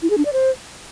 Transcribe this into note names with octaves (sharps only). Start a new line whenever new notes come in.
E4
G#4
D4
D5
C5